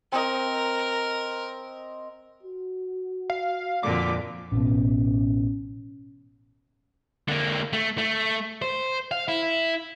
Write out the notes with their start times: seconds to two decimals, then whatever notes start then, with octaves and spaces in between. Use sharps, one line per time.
0.12 C4 A#4 D#5
2.43 F#4
3.30 F5
3.83 F2 A#2 D3 D6
4.52 A1 B2 C#4
7.28 D3 A#3
7.73 A3
7.98 A3
8.62 C5
9.11 F5
9.28 E4